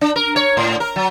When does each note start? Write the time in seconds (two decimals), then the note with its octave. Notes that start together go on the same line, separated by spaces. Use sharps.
0.01 D4
0.16 A#4
0.36 C#5
0.57 A2
0.80 A#4
0.96 F#3